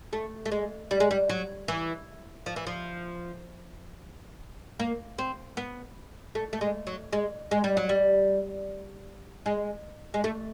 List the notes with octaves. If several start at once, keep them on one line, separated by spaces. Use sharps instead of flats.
A3
A3
G#3
G3
G#3
G3
F#3
E3
F3
E3
F3
A#3
C4
B3
A3
A3
G#3
F#3
G#3
G#3
G3
F#3
G3
G#3
G#3
A3